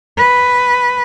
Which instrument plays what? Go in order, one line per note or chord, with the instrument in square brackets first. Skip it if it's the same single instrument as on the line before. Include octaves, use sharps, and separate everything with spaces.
[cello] B4